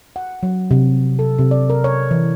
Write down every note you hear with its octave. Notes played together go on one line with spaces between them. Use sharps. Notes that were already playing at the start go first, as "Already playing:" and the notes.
F#5
F#3
C3
A4
C3
D5
A#4
C#5
E3